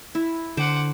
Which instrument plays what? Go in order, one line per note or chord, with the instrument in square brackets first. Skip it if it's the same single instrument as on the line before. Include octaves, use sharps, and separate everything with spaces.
[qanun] E4
[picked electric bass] D3 [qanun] C5 [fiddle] F#5 D6